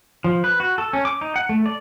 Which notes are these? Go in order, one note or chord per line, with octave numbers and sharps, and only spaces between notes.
F3
B4
F#4
A4
C#4
D6
D#4
F#5
A3
D5